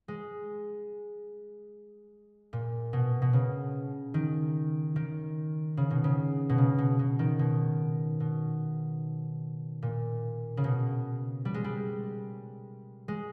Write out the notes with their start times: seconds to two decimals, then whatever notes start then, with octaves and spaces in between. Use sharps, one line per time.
0.08 G#3
2.53 A#2
2.93 B2
3.22 B2
3.33 C#3
4.14 D#3
4.96 D#3
5.77 C#3
5.90 B2
6.04 C#3
6.49 B2
6.58 C#3
6.78 B2
6.99 B2
7.19 D#3
7.39 B2
8.20 B2
9.83 A#2
10.57 C#3
10.64 B2
11.45 G3
11.54 G#3
11.64 G3
13.08 G#3